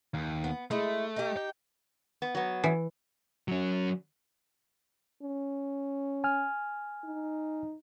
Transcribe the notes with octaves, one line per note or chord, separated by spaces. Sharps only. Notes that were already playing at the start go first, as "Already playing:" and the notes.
D#2
B3
G#3 A3 E4
D#4 G4
G5
B3
F#3 B3
E3
F#3 C#4
C#4
G#5 F6
D#4